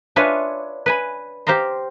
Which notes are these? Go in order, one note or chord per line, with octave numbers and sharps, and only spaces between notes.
D4 F4 B4 C#5 E5 G#5
B4 G#5 B5
G4 C5 F5 A#5 C6